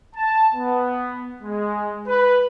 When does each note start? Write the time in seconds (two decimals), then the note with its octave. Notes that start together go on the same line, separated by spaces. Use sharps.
0.14 A5
0.53 B3
1.41 G#3
2.06 B4